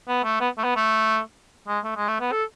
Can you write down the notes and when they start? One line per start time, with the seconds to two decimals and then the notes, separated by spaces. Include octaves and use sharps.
0.08 B3
0.24 A3
0.40 B3
0.58 A3
0.64 B3
0.76 A3
1.68 G#3
1.84 A3
1.96 G#3
2.08 A3
2.21 B3
2.32 A4